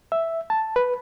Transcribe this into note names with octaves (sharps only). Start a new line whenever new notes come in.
E5
A5
B4